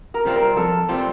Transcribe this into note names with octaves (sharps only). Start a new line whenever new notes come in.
A#4
C3 G3 C4 F4
A#4
F2 A4
C3 G3 C4 F4